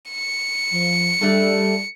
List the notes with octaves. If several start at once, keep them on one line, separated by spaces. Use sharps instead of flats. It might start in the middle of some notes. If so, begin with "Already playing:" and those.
C#7
F3
G3 A3 D4 A4